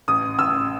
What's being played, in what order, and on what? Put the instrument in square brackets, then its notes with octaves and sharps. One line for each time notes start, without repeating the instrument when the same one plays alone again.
[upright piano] A1 D#6
A1 E6